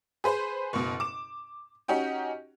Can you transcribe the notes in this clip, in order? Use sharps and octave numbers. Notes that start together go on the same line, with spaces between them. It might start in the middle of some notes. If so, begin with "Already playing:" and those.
G#4 B4 C5
F#1 B2
D6 E7
C#4 D#4 F#4 G4